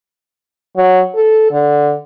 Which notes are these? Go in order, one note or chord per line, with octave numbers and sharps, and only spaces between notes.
F#3
A4
D3